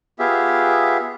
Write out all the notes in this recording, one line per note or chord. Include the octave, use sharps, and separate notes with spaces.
B3 F4 G4 G#4 E5